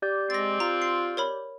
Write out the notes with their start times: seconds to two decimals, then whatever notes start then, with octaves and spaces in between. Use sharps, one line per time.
0.02 G4 D5 G6
0.30 G#3 C4 A6 A#6
0.60 F4 A#5
0.82 C7
1.17 A#4 C#5 B5